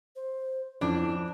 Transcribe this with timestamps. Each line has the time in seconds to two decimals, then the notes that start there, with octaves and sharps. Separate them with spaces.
0.16 C5
0.81 F2 C#4 D4 E4